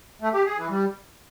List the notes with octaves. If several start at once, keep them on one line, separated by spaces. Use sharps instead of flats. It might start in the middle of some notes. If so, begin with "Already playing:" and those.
A3
G4
G#4
E3
G3